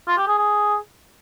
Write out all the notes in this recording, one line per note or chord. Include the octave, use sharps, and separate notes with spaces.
F4
G4
G#4
G#4